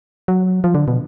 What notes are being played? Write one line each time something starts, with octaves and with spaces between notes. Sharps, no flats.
F#3
F3
D3
B2